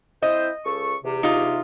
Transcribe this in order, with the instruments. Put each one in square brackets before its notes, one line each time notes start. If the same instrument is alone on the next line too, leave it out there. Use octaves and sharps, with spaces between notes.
[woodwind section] C4 E4 C5 [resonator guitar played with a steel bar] D#5
[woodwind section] C#2 A4 C#6
E2 C3
[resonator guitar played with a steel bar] D#4 F4